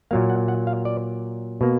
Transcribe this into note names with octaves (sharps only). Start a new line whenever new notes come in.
A#2 F#3 A#3 F5
F#5
F#5
F5
D5
B2 A#3